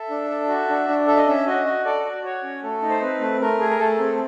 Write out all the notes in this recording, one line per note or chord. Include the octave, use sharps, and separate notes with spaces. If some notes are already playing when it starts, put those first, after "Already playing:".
Already playing: A4 E5
D4
A4
F#4
D4
D4
A4 E5
D#5
C#4 E5
F#4 D#5
F#4
A4 D5
F#4
F#4 C#5
C#4
A3 A4
D#4
C5
C4 B4
A3
A3 A#4
G#4
A#4
A3 A4
C4